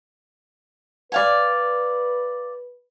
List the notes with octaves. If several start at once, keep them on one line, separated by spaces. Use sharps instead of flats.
B4 D5 F5 G#5